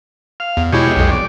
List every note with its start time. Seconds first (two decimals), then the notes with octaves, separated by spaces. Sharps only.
0.40 F5
0.57 E2
0.72 B2 G#3 E4 G4 C#5
0.96 B1 F2
1.11 D5